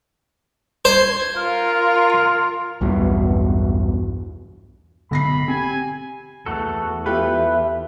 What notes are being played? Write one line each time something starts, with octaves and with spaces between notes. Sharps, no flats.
C5 G#6
F4 A#4 F5
B1 E2 G2 B2
B1 D3 B5 A#6 C7
C4 G4 G#5
E2 A3 F#4 A4
F4 G4 A4 B4 E5